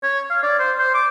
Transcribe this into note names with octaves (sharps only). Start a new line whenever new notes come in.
C#5
F5
D5
C5
C5
D6